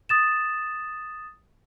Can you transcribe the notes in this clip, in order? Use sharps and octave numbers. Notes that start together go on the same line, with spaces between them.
D#6 A6 E7